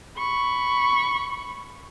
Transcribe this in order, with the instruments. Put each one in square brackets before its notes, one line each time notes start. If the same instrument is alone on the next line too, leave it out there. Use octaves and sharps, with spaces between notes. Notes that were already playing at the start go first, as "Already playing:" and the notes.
[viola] B5 C#6